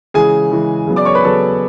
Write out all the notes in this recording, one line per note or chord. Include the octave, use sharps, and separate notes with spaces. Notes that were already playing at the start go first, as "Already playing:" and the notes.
C#3 E3 G#3 G#4 G#5
C#3 E3 G#3
C#3 F#3 B3
D5 D6
C#5 C#6
B4 B5
C#3 F#3 B3 A4 A5